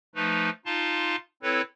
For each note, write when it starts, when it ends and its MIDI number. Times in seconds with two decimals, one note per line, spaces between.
0.15 0.50 53
0.15 0.50 57
0.15 0.50 63
0.15 0.50 71
0.66 1.16 63
0.66 1.16 65
0.66 1.16 77
0.66 1.16 81
0.66 1.16 84
1.43 1.62 60
1.43 1.62 64
1.43 1.62 69
1.43 1.62 71
1.43 1.62 73